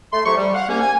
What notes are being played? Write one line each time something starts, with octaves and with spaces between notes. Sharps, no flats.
A3 C6
A2 C3 F#3 G4 C#6
G3
F5 F#5
C2 A#3 C#4
G#5